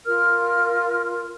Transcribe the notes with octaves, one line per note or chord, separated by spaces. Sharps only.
F4 A#4 F6